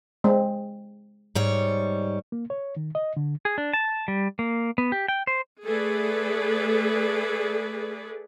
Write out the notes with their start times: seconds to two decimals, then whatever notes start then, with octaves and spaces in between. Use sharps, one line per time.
0.24 G#3 C4
1.35 G#2 G3 C#5
2.32 A#3
2.50 C#5
2.77 D#3
2.95 D#5
3.17 D3
3.45 G#4
3.58 D4
3.73 A5
4.08 G3
4.39 A#3
4.78 B3
4.92 G4
5.08 G5
5.27 C5
5.64 A3 G#4 A4 B4 D5